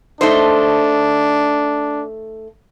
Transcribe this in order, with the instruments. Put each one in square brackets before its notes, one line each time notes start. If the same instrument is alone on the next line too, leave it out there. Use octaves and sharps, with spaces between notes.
[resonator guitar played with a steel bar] A3 D#4 C5 [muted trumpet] D4